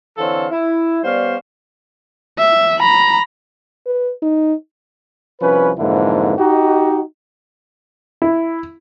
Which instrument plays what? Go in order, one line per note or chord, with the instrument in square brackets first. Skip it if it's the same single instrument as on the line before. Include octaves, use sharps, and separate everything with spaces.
[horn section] D3 E3 C4 A4 C#5 F5
E4
G3 B3 C#4 C5 D5 F5
[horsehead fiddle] E5
A#5 B5
[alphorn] B4
D#4
[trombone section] C2 F3 C#4 B4
F2 G#2 D3 E3 A#3 E4
D#4 F#4 G4
[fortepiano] E4